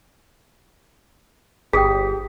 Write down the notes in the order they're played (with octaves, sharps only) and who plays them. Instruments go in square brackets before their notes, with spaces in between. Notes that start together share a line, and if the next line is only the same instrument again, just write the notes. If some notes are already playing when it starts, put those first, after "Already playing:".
[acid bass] G1 [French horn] G4 [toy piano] G#4 [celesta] G5 D#6 B6